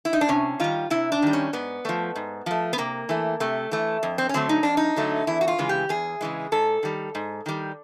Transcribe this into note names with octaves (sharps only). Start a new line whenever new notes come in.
E4
D#4
D4
C3 C#4
D#3 G3 F4
C3 E4
D4
D#3 G3
C#4
G#2 B3
F3 A3
G#2
F3 A3
B3
C3 A#3
E3 A3
C3 A3
E3 A3
F2
C4
C#4
D3 F#3 A3 C4
D#4
F2 D4
D#4
D3 F#3 A3
E2 E4
F#4
F4
C#3 E3 G#3
G4
E2 G#4
C#3 E3 G#3
G#2 A4
D#3 G3
G#2
D#3 G3